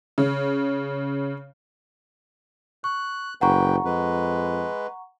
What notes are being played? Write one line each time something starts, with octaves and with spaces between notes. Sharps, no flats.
C#3
C#6 F#6
F#1 B4 F#5 G5 A#5 C#6
F2 G#3 B4